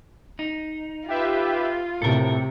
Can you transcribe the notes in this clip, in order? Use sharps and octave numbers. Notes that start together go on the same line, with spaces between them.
D#4
F4 G4 B4 E5
A2 C3 A4 A#4